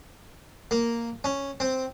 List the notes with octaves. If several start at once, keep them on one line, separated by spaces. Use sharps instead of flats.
A#3
C#4
C4